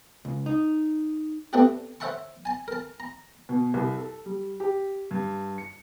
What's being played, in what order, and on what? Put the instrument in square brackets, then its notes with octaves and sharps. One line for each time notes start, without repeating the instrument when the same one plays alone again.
[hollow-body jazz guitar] C#2
D#4
[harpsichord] A3 B3 C4 D4 F#4 G4
C5 C#5 E5 F#5 A5 C#6
G#5 A5
A#4 A5
A#5
[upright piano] B2
C2
A4
G3
G4
G2
C#7